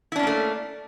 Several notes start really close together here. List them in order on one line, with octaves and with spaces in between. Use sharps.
E4 D4 C#4 A#3 A3